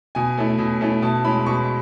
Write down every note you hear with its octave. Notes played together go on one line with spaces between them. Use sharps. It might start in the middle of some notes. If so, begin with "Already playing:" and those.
B2 G#5
A3 C#4 E4
B2
A3 C#4 E4
B2 A5
G#3 C#4 E4 B5
B2 C#6